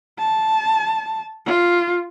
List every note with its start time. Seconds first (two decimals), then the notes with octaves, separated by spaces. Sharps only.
0.19 A5
1.46 F4